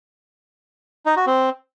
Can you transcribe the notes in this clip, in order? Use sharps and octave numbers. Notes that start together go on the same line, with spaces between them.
D#4
F#4
C4